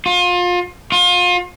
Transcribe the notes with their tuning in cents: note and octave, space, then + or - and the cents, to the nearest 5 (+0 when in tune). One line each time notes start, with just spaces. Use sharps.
F4 +30
F4 +30